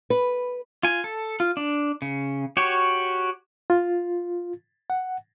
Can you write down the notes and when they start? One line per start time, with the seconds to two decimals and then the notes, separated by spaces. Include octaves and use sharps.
0.10 B4
0.83 F4 G#5
1.04 A4
1.40 F4
1.57 D4
2.02 C#3
2.57 F#4 G4 C#5
3.70 F4
4.90 F#5